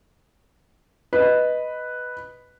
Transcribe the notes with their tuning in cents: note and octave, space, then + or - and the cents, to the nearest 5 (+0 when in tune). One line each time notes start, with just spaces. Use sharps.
B4 +0 D#5 +0